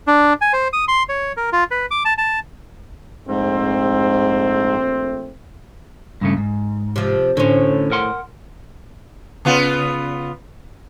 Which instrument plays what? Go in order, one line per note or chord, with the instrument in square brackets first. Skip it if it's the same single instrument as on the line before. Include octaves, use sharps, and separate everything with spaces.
[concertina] D4
G#5
C5
D#6
C6
C#5
A#4
F4
B4
D6
A5
A5
[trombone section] A#1 A3 C4 [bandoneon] G#2
[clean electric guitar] G2 C#3 A3
G#2
[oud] C3 F3
[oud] A2 C5 [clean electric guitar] D3 C#4
[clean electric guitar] A#4 F#5 C6
[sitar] C#3 B3 F4